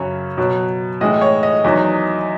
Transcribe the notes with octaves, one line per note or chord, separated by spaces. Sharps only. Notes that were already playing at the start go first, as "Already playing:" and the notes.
Already playing: F#2 C#3 F#3 C#5
B2 F#3
A2 E3 G#3 D#5
C#5
D#5
E2 D#3 F#3